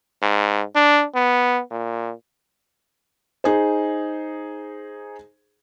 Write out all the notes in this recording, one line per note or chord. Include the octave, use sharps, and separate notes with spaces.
G#2
D4
B3
A#2
D#4 G#4 C5